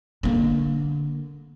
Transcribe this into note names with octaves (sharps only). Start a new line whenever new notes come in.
D3 A#3